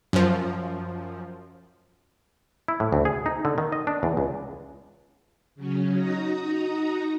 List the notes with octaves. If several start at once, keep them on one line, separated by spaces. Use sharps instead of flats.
F#2 F3
E4
A2
D2
G#4
D#4
D3
D#3
D#5
D4
E2
C#2
C#3 F#3 C#4
D#4 F#4 A#5 D#6 A#6